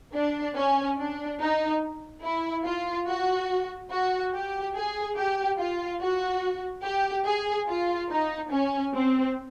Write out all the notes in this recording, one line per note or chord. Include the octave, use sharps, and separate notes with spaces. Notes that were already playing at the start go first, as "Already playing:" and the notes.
D4
C#4
D4
D#4
E4
F4
F#4
F#4
G4
G#4
G4
F4
F#4
G4
G#4
F4
D#4
C#4
C4